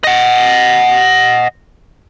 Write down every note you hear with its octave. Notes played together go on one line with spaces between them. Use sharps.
D#5 F#5